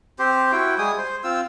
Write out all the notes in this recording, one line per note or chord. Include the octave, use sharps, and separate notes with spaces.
C4 G4 C5
E4 F#4 G5
G3 G#3 G#5 D#6
C5
C4 F4 E6